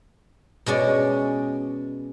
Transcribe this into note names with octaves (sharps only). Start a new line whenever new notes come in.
B2 G#3 C#4 D5